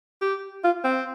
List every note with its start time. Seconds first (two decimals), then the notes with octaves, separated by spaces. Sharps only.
0.21 G4
0.64 F4
0.84 C4